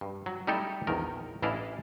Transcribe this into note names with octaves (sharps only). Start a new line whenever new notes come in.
G2
F#3
G3 A3 D#4 E4 G4 A4
A#1 E2 D#3 A#4
A1 E3 D4 E4 D#5 F5